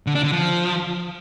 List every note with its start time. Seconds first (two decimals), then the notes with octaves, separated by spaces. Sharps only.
0.07 D3
0.15 D4
0.23 D3
0.32 F3